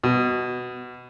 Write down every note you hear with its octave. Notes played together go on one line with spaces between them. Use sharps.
B2